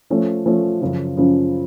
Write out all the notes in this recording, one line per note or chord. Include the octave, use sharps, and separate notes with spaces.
F3 A3 C#4
F3 A3 C#4
F#2 C#3 F3
F#2 C#3 F3